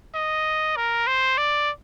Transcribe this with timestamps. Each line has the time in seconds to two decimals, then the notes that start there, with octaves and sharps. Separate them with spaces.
0.14 D#5
0.76 A#4
1.07 C5
1.37 D5